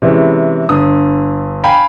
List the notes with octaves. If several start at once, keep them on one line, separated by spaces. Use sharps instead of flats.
C3 E3 G#3 C#4
G1 D3 D#6
F5 G5 G#5 B5